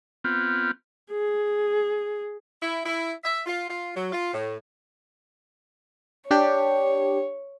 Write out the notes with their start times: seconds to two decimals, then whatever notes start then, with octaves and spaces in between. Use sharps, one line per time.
0.24 B3 C4 F4
1.11 G#4
2.61 E4
2.84 E4
3.24 E5
3.45 F4
3.69 F4
3.95 F#3
4.13 F4
4.33 A2
6.31 D4 G4 C#5